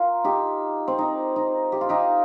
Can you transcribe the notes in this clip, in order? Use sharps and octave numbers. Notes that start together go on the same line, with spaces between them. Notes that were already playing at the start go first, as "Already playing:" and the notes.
Already playing: F4 A#4
D#4 G4
C4
D#4
D#4
G4
F4
D#4 G4